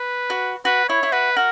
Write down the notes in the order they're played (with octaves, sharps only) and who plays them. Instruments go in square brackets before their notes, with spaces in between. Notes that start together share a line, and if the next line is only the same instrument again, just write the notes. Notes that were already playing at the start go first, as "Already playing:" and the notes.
Already playing: [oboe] B4
[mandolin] F#4
[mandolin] F#4 [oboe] B4
[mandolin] E4 [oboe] C#5
[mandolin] E4
[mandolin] F#4 [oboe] B4
[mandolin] F#4 [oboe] A#4